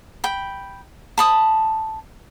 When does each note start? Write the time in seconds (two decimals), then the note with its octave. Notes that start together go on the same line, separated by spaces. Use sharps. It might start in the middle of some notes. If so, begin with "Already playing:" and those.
0.24 G5 B5
1.18 A5 B5 D#6